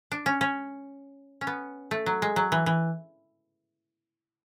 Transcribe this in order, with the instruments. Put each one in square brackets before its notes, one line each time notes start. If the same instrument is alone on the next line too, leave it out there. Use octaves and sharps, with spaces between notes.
[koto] D4
C#4
C#4
C#4
B3
A3
F#3
G#3
F#3
E3
E3